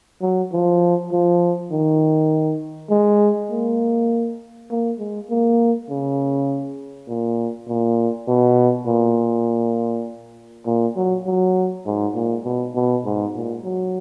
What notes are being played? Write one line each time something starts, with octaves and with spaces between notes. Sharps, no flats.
F#3
F3
F3
D#3
G#3
A#3
A#3
G#3
A#3
C#3
A#2
A#2
B2
A#2
A#2
F#3
F#3
G#2
A#2
B2
B2
G#2
A#2
F#3